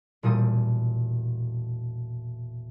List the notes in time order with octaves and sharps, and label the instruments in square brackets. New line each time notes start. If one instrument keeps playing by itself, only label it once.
[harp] E1 A#2 G3 D#6 D#7